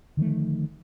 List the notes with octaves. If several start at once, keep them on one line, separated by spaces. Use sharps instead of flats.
D3 D#3 F3 A3